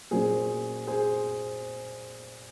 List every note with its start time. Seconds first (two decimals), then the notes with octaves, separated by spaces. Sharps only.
0.11 A#2 F#3 A#3 C#4 G#4 C5
0.87 G#4 C5